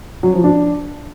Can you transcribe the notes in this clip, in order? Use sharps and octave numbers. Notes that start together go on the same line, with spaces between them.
F#3
F3
D4